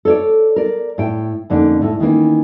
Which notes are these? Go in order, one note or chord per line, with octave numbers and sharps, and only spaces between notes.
A4 C#5 D5
A#4 D5
A2 G5
F2 D3 A#3 C#4 D#4
A2 A3
D#3 E3 A#3 C#4